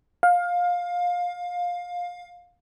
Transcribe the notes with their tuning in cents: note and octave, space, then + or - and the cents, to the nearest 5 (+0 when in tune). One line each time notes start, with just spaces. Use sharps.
F5 +20